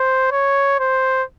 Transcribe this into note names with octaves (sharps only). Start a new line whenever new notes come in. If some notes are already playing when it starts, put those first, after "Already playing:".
Already playing: C5
C#5
C5